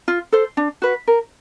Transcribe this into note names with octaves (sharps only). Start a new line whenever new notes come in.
F4
A4 C5
D4
F#4 B4
A#4